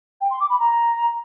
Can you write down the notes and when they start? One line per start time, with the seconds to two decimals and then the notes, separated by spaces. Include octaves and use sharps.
0.21 G5
0.31 C6
0.40 D6
0.50 B5
0.59 A#5